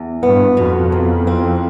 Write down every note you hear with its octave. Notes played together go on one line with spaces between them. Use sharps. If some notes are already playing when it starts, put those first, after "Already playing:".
Already playing: E2
G2 B3
F2 B2
E2
C4